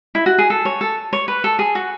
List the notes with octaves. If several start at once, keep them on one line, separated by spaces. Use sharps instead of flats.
E4
F#4
G#4
A4
C#5
A4
C#5
B4
A4
G#4
F#4